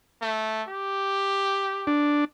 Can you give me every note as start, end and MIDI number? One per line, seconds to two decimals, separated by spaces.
0.22 0.63 57
0.68 1.89 67
1.87 2.25 62